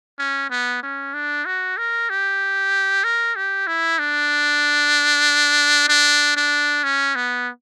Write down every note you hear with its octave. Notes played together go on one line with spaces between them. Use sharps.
C#4
B3
C#4
D4
F#4
A#4
G4
A#4
G4
E4
D4
D4
D4
C#4
B3